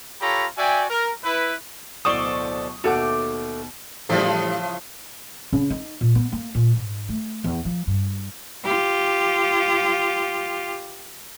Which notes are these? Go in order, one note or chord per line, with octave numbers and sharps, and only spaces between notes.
F4 G4 A4 C#5 A#5 B5
F#4 D5 E5 G5 G#5
A#4
E4 B4
D1 B2 A4 C5 D5 C#6 D#6 G7
D#2 B2 A3 F#4 A4 F#5 G#5 D6
A2 C#3 E3 F3 G3 D4
C#3
D#4
A#2
B3
A#3
A#2
G#2
A3
E2
F3
G2
F4 G4